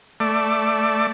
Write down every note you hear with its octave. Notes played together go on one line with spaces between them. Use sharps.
A3 D5